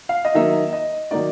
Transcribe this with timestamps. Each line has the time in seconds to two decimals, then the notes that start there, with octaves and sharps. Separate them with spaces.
0.09 F5
0.25 D#5
0.34 D#3 F#3 A#3 D#4 E5
0.73 D#5
1.11 D#3 F#3 A#3 D#4 D5